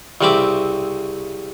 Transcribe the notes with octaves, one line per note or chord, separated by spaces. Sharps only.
C2 C#3 C4 E5 B5 D6